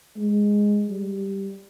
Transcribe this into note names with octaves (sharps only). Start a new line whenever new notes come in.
G#3
G3